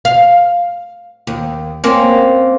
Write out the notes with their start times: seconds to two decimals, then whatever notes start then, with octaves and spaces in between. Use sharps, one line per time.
0.05 F5
1.27 D#2
1.84 A#3 C4 C#4